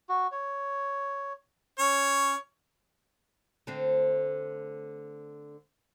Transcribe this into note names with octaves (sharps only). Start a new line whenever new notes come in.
F#4
C#5
C#4 C#5
D3 A3 C4